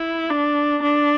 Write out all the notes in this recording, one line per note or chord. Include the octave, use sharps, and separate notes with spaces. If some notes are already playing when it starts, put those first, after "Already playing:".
Already playing: E4
D4
D4